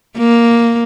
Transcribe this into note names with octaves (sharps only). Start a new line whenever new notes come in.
A#3